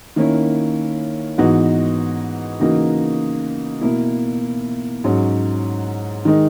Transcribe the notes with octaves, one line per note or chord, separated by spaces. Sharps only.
D#3 A#3 C#4 E4
G#2 E3 B3 D#4 F#4
C#3 E3 A#3 D#4 F#4
B2 A#3 E4
G#2 F#3 C#4
D#3 G#3 D#4